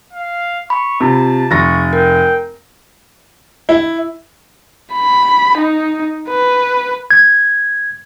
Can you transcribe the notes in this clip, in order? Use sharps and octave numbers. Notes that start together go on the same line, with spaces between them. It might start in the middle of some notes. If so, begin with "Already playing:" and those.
F5
B5 C#6
C3 F4 A5
F1 C#6 A6 A#6
A#4 G5
E4
B5
D#4
B4
G#6